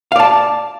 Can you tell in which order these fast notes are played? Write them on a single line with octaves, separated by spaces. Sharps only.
F5 D5 A5